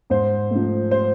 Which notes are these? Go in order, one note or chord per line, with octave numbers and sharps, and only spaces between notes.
G#2 C5
F3 A3
C5